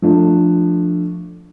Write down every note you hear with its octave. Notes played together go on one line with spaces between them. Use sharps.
F3 A3 D4